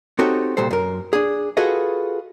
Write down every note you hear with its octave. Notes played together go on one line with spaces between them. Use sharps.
C4 D#4 F#4 G4 A4 C#5
C2 A#2 G3 A4 C5
F#2 A#4
D4 G#4
F4 F#4 G#4 A4 B4 D#5